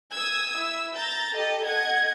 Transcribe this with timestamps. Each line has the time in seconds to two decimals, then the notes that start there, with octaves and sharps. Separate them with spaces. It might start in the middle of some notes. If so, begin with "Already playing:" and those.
0.12 D#6 E6 G#6
0.53 E4 E6
0.94 A#5 G6 A6
1.35 G4 A4 D#5
1.66 D#5 F#5 G#6